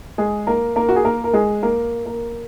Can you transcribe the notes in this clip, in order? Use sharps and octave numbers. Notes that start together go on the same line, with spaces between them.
G#3 G#4
A#3 A#4
A#3 A#4
F#4
G#4
A#3 A#4
A#4
G#3 G#4
A#3 A#4
A#3 A#4